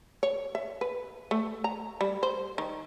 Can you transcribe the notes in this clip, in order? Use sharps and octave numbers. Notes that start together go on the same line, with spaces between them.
C#5
E5
B4
A3
A#5
G3
C5
D#3